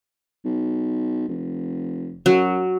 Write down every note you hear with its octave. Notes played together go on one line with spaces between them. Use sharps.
B1
F1
F#2 F#3